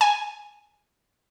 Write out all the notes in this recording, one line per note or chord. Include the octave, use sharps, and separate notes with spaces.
G#5